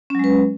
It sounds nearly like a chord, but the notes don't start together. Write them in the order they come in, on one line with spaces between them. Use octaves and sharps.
C#4 F#3 G#3 B4